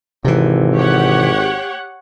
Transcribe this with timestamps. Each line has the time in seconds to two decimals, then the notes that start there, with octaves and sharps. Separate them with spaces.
0.25 G#1 C3 E3
0.77 G4 C#5 F#5